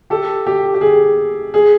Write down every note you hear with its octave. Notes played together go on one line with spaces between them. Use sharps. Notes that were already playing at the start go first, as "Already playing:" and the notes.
G4 A4
G4
G4
G#4
G#4